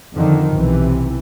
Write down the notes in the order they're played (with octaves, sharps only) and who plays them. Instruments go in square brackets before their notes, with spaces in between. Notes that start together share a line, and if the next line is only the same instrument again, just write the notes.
[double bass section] F2 D3 D#3 F3
B1 C3 E3